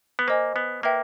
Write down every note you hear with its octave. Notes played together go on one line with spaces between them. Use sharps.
B3
A#3 C5 D#5 G#5
B3
A#3 B4 E5 G5